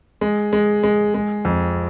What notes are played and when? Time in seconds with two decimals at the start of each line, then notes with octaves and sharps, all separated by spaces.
0.21 G#3
0.53 G#3
0.83 G#3
1.14 G#3
1.45 F2